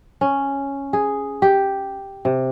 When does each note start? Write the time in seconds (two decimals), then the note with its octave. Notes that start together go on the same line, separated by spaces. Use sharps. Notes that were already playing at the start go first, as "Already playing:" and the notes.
0.21 C#4
0.93 G#4
1.42 G4
2.25 C3